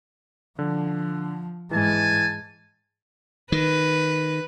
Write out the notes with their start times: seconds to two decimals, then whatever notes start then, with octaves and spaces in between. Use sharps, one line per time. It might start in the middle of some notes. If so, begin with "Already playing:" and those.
0.59 D3 F3
1.71 G#2 E3 G#3 G#5 A5
3.52 D#3 B4